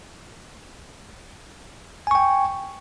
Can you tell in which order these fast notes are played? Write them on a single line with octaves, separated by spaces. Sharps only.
G#5 C#6 G5